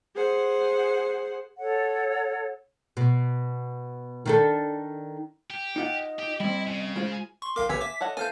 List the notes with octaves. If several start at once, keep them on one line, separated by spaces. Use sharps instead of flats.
G#4 C5 F#5
A4 C#5 F#5
B2
D#3 D4 A4
G4
D#4 F4 D#5 F#5
G4
G3 C4 E4
C#3
G#3 F4 C5
C6 C#6
B1 A#4 F5 G5 D6
A#1 D3 G4 B4 C#5 G#5 E6 B6
E5 D6
A4 C#5 D#5 F#5
E3 A4 C5 F5 G#5 F6 G6